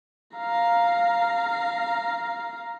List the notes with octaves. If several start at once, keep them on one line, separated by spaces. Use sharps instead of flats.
F5 A#5